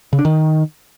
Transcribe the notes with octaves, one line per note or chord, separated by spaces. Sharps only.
C#3
D4
D#3